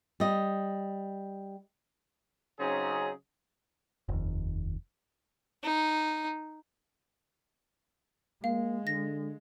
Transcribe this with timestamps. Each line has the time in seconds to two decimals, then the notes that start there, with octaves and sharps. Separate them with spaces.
0.20 G3 D#5
2.59 C#3 F#3 C4 C#4 D#4 G#4
4.09 F1 D#2
5.63 D#4
8.44 G#3 A#3 F5
8.87 D3 A#6